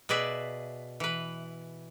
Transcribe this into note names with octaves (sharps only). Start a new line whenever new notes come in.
B2 G#4 B4 D5 E5
E3 B4